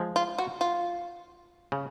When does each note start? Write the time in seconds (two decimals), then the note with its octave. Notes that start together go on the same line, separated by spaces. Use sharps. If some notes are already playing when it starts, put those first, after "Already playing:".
Already playing: F3 G#3
0.16 F4
0.38 F#4
0.61 F4
1.72 C#3